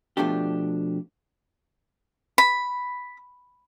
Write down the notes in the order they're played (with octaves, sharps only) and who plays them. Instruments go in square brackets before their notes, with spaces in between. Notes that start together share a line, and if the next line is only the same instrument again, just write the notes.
[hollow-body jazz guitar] B2 F3 A3 D4 G4
[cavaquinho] B5